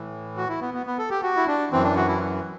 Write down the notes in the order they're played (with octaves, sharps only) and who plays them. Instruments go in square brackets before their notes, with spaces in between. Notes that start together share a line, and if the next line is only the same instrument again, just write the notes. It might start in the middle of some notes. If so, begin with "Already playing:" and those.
Already playing: [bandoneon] A2 E3
F#4
E4
B3
B3
B3
A4
G4
F#4
E4
D4
F#2 E3 C4
D4
F#4
E4